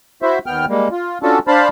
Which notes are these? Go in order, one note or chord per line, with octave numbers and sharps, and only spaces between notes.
E4 F#4 C5 E5
D#2 B3 G5 F6
G3 G#3 A#3
F4
C#4 D4 F4 F#4 A4 A5
D4 C5 F5 A5 B5